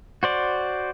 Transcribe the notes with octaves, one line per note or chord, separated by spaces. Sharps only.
F#4 C5 D5